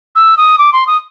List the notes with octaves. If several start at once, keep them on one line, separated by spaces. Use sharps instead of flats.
E6
D#6
D6
C6
D#6